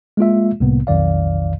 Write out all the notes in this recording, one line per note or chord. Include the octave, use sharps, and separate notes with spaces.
G#3 A#3 F4 E5
C2 A2 C3 A#3 B3
B1 F2 D#3 D5 F5